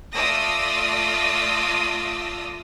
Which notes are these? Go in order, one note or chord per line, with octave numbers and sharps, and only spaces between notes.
A3 F4 D5 D#6 E6 A#6